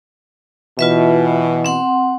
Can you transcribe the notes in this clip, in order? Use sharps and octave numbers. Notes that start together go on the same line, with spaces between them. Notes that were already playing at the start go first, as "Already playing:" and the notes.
B2 E3 F4 B4 E5
C4 F#5 C6